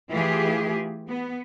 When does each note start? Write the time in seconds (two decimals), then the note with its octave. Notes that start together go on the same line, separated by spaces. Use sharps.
0.10 E3 A3 F4 G4 G#4
1.09 B3